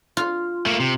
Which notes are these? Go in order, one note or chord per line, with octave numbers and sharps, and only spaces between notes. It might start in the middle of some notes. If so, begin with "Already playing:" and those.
F4
A3 A#3
C3